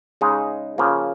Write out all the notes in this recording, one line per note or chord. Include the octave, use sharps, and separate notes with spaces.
C#3 G#3 D#4 G#4
C#3 F3 A#3